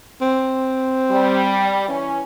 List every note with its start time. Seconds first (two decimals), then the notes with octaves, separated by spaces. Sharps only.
0.21 C4
1.11 G3
1.88 E3 C#4